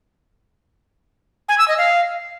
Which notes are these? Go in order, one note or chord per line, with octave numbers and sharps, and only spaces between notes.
G#5
E6
D#5
F5